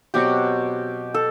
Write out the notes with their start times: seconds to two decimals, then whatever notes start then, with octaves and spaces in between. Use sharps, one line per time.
0.14 B2 F#3 C4 F#4 G4
1.14 A4